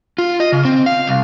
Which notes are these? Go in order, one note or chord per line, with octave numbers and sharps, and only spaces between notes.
F4
D#5
C#3
C4
F5
C2